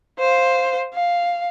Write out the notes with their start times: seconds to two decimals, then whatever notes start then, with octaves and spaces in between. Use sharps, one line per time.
0.19 C5 F5
0.94 F5